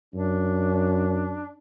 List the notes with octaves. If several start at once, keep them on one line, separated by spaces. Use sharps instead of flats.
F#2 D4